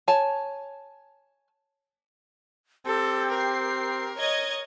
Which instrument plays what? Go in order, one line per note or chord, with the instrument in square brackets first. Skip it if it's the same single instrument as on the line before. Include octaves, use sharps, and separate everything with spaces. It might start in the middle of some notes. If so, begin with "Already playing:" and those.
[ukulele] C#5 G#5 A5
[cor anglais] C4 [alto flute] G4 [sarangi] A4
[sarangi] A#4 [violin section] C7
[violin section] C#5 D#5 G#6